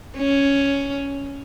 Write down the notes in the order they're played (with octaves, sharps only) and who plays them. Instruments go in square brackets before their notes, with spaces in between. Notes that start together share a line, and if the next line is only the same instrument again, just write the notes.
[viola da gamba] C#4